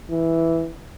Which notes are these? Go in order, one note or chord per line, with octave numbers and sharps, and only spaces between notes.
E3